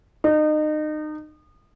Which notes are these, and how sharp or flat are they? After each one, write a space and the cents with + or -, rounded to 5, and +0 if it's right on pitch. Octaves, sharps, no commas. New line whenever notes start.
D#4 -30